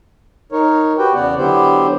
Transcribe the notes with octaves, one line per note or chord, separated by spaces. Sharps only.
D#4 A#4 C#5
F#4 G4 B4 G5
E2 C#3 B3 D5 F#5
D3 F#3 B3 E4 G4 C5